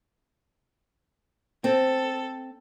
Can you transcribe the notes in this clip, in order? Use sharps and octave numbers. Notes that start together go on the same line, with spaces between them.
C4 A4